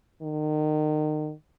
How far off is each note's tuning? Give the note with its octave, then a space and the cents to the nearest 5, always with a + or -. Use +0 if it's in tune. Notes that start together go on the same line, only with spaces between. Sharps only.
D#3 -30